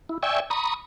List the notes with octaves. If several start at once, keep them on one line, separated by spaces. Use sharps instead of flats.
E4
D5 E5 G5 G#5 C#6 E6
A#5 B5 C#6 D#6